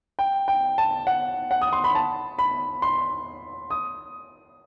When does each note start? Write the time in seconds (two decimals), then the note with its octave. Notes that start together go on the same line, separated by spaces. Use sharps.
0.19 G5
0.48 G5
0.78 A5
1.07 F#5
1.51 F#5
1.62 D#6
1.73 C6
1.84 B5
1.95 A5
2.39 B5
2.82 C6
3.70 D#6